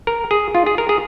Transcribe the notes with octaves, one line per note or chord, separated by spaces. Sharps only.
A#4
G#4
F4
G#4
A#4
G#4